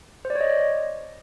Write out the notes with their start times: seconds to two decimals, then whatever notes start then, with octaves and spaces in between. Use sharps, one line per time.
0.25 C5
0.30 D5
0.35 C#5
0.41 D#5